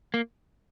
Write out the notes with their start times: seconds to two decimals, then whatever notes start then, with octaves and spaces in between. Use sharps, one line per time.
0.14 A#3